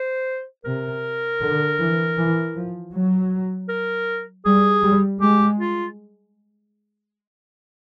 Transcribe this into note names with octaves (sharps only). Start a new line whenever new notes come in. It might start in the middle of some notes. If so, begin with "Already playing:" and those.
Already playing: C5
C3 A#4
D3
E3
E3
F3
F#3
A#4
G3 G#4
G3
G#3 G4
F4